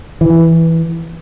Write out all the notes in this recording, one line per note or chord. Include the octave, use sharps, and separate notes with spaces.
E3